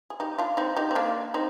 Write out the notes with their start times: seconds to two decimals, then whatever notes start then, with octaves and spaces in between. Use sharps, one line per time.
0.10 G#4
0.20 D#4 G4
0.38 D4 F4
0.57 C4 D#4
0.77 D#4 G4
0.91 C4
0.95 A#3 D4
1.34 C4 D#4